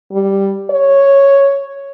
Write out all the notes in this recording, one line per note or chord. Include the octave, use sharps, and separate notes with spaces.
G3
C#5